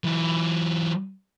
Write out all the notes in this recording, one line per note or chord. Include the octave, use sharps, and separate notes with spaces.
E3 F#3